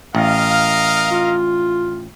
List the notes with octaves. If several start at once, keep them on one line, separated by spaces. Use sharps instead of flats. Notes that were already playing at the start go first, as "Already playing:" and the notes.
A1 A#4 D#5 F5
F4